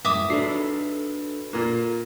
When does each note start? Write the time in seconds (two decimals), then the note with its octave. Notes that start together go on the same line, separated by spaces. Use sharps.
0.05 F#2 A2 E5 D6 D#6
0.30 D4 F#4 A4 B4 C7
1.53 A#2 A#3